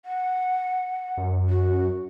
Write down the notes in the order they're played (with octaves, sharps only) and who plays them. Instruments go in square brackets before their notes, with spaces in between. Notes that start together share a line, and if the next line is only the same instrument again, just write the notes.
[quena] F#5
[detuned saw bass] F#2
[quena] F#4